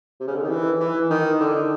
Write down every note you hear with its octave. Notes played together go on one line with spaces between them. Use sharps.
C3
C#3
D3
D#3
E3
E3
D#3
D3